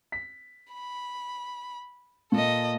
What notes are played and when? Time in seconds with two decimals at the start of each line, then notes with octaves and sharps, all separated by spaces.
0.12 B6
0.73 B5
2.32 A#2 A4 D#5